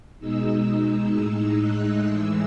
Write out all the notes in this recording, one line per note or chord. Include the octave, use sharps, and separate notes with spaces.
B2 G#3 D#4 E6
E6
A2 G#3 D#4
F#6
A2 E3 G#3 E6